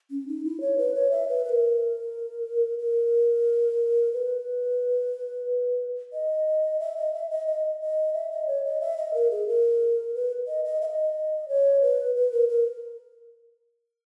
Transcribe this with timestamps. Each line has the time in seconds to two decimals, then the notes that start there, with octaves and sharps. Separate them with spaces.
0.11 C#4
0.27 D#4
0.44 E4
0.61 C#5
0.77 B4
0.95 C#5
1.11 E5
1.28 B4
1.45 B4
1.49 A#4
2.78 A#4
4.13 B4
6.13 D#5
6.80 E5
6.97 D#5
7.14 E5
7.30 D#5
7.47 D#5
7.81 D#5
8.14 E5
8.31 D#5
8.47 C#5
8.64 D#5
8.81 E5
8.97 D#5
9.14 A#4
9.31 G#4
9.48 A#4
10.14 B4
10.47 D#5
10.65 D#5
10.82 E5
10.85 D#5
11.48 C#5
11.81 B4
12.15 B4
12.32 A#4
12.49 A#4